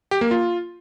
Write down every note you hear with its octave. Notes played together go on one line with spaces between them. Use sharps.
G4
A#3
F4